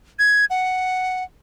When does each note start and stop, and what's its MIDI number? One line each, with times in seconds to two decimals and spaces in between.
0.19 0.45 92
0.50 1.23 78